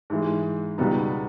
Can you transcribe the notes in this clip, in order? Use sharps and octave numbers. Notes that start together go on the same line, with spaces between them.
G#2 E3 G#3
C#2 B2 G3 B3 D#4